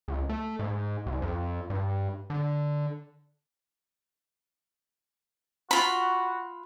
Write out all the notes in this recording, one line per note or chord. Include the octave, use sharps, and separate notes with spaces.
C#2
A3
G#2
C2
F2
G2
D3
F4 F#4 B5